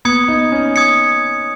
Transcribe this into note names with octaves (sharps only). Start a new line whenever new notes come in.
B3 D#6 G#6 C#7
D#4
C#4
D#6 G#6 C#7